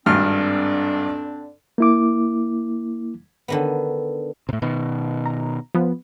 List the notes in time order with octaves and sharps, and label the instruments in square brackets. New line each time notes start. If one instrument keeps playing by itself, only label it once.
[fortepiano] G#1 G2 F6 [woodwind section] D3 C4 D4
[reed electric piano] A#3 E4 D6
[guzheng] D3 D#3 B3
[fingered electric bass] A2 C3
B2 D#3
[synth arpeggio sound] A#5
F3 B3